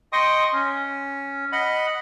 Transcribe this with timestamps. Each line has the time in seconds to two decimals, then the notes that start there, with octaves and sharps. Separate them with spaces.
0.13 D#5 G5 C6 C#6 D#6
0.53 C#4
1.52 D#5 F#5 B5